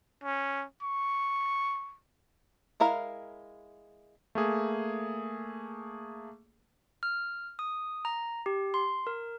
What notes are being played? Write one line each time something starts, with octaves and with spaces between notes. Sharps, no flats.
C#4
C#6
G#3 E4 A#4 F5
A3 A#3 G#4
F6
D#6
A#5
G4
C6
A#4